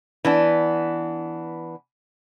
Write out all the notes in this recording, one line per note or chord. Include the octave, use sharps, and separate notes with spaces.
E3 B3 D4